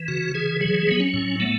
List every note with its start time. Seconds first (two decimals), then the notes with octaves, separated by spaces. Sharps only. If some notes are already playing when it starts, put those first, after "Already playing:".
Already playing: E3
0.08 C#3 F#4
0.34 E3 G#4
0.61 F#3 G#4
0.87 F#3 B3
1.00 C#4
1.14 A2
1.40 A3 B3